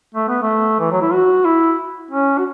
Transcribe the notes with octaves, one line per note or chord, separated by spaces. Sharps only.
A3
B3
A3
E3
F#3
E4
F#4
E4
C#4
F#4